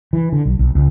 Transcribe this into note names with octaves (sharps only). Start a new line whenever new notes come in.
E3
D3
B1
B1
C#2